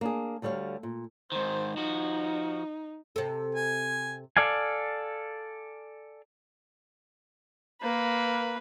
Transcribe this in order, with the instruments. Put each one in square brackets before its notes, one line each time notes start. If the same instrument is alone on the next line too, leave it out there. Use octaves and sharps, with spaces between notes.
[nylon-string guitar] A#3 D4 G#4
D2 D3 G3 C#5 F5
A#2
[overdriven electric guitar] G#2 D#3 [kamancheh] C5
[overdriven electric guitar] F3 F#4 [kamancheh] D#4
[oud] C3 A4
[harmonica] G#5
[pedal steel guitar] A4 D5 F5 G#5
[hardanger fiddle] A#3 B4